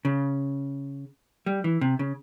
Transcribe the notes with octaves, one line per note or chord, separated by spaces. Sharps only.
C#3
G3
E3
C3
C#3